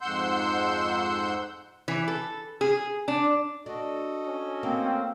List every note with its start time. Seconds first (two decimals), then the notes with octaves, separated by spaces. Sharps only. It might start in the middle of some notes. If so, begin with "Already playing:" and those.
0.01 F2 G#2 F#5 C6 E6 G6
1.88 E3
2.08 A4
2.61 G#4
3.08 D4
3.66 D4 F#4 A4 D#5
4.26 C#4
4.63 A#3 C4